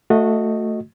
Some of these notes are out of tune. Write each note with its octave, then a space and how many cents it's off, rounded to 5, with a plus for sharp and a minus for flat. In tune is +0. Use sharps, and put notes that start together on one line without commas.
A3 +10 F#4 -20 D#5 +0